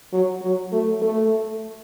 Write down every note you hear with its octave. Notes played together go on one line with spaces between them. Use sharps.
F#3
F#3
A3
A3